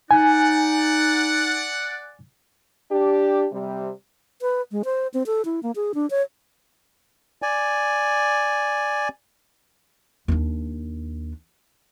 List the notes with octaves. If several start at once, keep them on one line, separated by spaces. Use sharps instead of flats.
D#4 D5 F#5 G#5
D4 G4
C3 G3
B4
G#3
C5
C4
A4
E4
A#3
G#4
D4
C#5
D5 G#5
D#2 D4